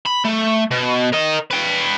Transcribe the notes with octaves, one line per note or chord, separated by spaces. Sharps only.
B5
A3
B2
A#4 D#5
B4 G5